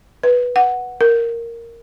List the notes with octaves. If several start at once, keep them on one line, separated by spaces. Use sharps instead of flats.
B4
F#5
A#4